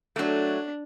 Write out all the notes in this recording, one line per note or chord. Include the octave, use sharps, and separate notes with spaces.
F#3 A3 D4